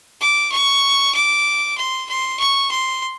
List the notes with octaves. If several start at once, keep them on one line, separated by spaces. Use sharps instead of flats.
D6
C#6
D6
C6
C6
C#6
C6